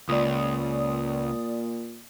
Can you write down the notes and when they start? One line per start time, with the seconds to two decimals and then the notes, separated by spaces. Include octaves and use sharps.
0.09 C#2 A#2 D5 D#6